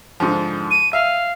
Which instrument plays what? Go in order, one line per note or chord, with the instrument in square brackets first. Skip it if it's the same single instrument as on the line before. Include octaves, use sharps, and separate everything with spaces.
[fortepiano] G#2 D3 F3
[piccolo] D#7
[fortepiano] E5 [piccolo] F5